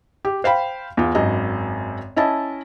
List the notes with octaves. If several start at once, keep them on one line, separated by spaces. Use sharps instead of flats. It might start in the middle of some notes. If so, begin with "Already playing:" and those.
G4
C5 F5 G5 B5
E2 F4
G#1 F#2 D#5
C#4 E4 D#5 A5